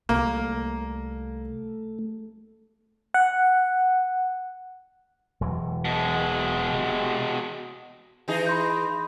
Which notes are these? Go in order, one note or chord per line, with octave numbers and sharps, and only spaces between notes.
C2 A3 A#3
F#5
E1 E3 F#3
B2 G#3
C3
E3 D#4 G#4
B5 C6 G6